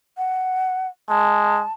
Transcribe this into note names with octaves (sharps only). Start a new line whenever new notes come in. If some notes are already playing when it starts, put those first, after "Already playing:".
F#5
G#3 A5